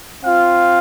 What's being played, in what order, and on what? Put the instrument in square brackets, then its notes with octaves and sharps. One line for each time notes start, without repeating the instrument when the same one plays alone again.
[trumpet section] C4 F4 F5